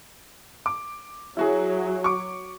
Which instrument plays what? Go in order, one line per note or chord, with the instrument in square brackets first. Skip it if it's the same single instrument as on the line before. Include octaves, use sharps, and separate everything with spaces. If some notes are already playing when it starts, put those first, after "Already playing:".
[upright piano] D6
[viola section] F#3 [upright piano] E4 F#4 G#4
[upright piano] C#6 D6